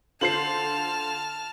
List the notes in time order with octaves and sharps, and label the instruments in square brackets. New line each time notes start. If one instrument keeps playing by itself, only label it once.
[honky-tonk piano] D3 F4 C5 [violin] A5 F6 [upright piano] C7 F#7